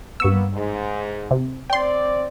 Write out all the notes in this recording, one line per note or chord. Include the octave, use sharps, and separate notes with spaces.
G2 A#3 B3 C#6 E6
G#2
C3
C4 D5 G5 C6